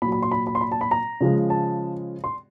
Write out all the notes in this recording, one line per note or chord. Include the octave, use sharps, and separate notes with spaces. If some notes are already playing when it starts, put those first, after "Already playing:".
A#2 F#3 B5
B5
C6
B5
B5
C6
B5
A5
B5
A#5
C#3 F3 G#3
A5
C6